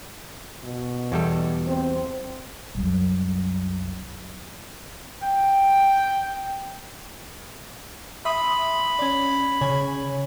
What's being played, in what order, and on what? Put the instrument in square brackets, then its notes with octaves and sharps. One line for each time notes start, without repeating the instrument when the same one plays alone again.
[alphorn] B2
[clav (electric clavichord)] E2 G3 A4
[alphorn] C4
[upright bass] C2 F#2
[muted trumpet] G5
[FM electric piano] E5 C6 D#6 [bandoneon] B5
[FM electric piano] C#4 D5
[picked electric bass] C#3 [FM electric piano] C#5 G#5